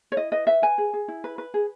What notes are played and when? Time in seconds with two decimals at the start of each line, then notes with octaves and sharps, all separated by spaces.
0.12 C#5
0.17 E4 D#5
0.32 B4 D#5
0.47 B4 E5
0.62 B4 G#5
0.78 G#4
0.94 G#4
1.08 E4
1.24 B4
1.38 B4
1.54 G#4